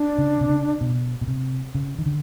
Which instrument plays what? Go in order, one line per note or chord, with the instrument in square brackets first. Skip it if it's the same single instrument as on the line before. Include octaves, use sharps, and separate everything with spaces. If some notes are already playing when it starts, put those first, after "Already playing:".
Already playing: [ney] D4
[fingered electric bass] C#3
C3
C#3
B2
B2
C3
C#3
D#3
D3